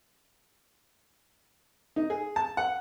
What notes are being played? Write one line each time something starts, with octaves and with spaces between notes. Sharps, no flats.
D#4
G#4
A5
F#5